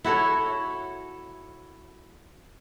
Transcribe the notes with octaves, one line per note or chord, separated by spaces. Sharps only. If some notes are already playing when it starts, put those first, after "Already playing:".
E4 F#4 A4 C#5